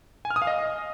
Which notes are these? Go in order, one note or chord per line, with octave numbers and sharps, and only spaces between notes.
G#5
F6
D#6
F5
D#5